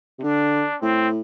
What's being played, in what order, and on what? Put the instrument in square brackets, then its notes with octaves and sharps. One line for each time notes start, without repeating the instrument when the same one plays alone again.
[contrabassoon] C3
[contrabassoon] D3 [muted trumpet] D4
[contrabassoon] A2 [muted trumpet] C4